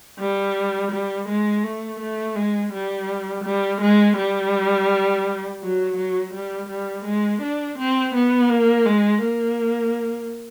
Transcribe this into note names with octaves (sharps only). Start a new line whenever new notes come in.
G3
G3
G#3
A3
A3
G#3
G3
G3
G#3
G3
F#3
F#3
G3
G3
G#3
D4
C4
B3
A#3
G#3
A#3